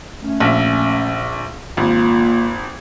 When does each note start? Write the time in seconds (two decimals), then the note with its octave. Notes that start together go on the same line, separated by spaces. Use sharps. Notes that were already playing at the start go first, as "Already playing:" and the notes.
0.22 A3 C#4
0.40 A#1 E5
1.77 G#1 A#3 F4